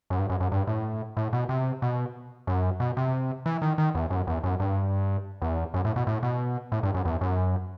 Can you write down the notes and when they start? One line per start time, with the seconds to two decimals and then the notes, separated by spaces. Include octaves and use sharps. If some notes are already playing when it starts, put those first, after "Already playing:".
0.10 F#2
0.19 G2
0.30 F#2
0.40 F#2
0.52 G2
0.67 A2
1.17 A2
1.33 B2
1.49 C3
1.82 B2
2.47 F#2
2.80 B2
2.97 C3
3.46 E3
3.62 D#3
3.78 D#3
3.95 E2
4.10 F#2
4.27 E2
4.44 F#2
4.60 G2
5.42 E2
5.74 F#2
5.85 A2
5.96 B2
6.07 A2
6.23 B2
6.72 A2
6.83 G2
6.94 F#2
7.05 E2
7.21 F#2